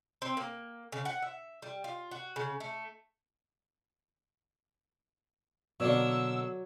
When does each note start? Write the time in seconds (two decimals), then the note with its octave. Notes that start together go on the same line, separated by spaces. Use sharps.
0.22 C4
0.37 A#3
0.92 C#3
1.05 F#5
1.22 E5
1.62 G3
1.84 F4
2.11 F#4
2.36 C#3
2.60 A3
5.80 B2 D3 F#3 A#3 D5 E6